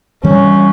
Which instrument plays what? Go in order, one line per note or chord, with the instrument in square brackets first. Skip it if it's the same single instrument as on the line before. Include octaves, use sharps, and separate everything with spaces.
[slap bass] E3 G3 C4 [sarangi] C#4